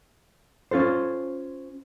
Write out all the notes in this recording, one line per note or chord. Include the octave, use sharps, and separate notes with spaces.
C#4 F4 A4 C5